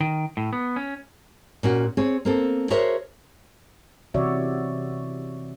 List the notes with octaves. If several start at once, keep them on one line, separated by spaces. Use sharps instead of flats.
D#3
A2
B3
C#4
A#2 C#4 F#4
C4 G#4 C#5
A#3 C4 A4
F#4 G#4 A#4 C5 C#5 E5
C3 E3 F#4 C#5 D5 E5